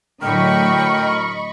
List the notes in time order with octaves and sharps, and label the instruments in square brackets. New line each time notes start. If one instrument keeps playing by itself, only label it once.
[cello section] A2 D3 F#3 [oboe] A#4 [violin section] D#5 B5 C#6 [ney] G5